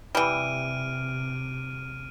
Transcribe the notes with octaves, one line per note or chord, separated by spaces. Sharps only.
C3 E3 G3 F6 D7 D#7